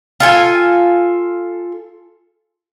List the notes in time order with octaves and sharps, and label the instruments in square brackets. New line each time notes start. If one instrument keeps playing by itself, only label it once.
[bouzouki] F4 A4 G#5